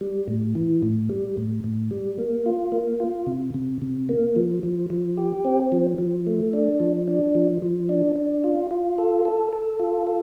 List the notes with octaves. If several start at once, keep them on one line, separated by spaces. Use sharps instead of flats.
G3
A2
E3
A2
G3
A2
A2
G3
A#3
F4
A#3
F4
C3
C3
C3
A#3
F3
F3
F3
G4
C4
F3
F3
A3
D4
F3
D4
F3
F3
D4
D4
F4
F4
A4
A4
A4
F4
A4